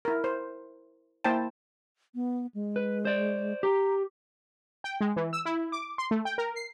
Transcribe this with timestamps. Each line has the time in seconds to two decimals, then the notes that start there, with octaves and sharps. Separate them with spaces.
0.05 E4 A#4
0.24 C5
1.24 A#3 E4 C5 G5 A5
2.15 B3
2.55 G#3
2.76 B4
3.05 C5 D5
3.63 G4 A#5
4.84 G5
5.01 G#3
5.16 E3
5.33 E6
5.45 E4
5.72 D6
5.98 C6
6.11 A3
6.25 G5
6.38 A#4
6.56 C7